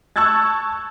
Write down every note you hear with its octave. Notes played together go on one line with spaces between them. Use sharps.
A5 C#6 E6 F#6 G#6 A6